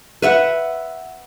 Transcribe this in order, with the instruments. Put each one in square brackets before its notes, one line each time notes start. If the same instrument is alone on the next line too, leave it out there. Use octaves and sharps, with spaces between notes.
[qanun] B4 E5 F#5